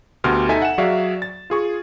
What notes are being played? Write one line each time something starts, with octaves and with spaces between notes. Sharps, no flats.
D2 B2 F#4 G4 C6 F6
D#4 A4 E5 G#5
F#5 E7
F#3 F#4 G#4 D5 E5 F5
A6
F4 G#4 C#6